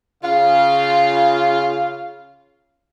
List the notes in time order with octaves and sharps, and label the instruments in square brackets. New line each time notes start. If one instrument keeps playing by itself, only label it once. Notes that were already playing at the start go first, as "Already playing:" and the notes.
[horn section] C#3 F4 F5